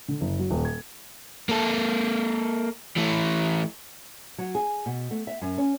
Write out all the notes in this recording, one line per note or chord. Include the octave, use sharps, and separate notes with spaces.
D3
F#1
F#3
D#1
G#6
A#3 A4
E3 A3
F#3
G#4
B2
A3
E5
F#2
C#4